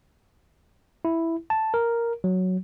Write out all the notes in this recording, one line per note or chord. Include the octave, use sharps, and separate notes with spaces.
E4
A5
A#4
F#3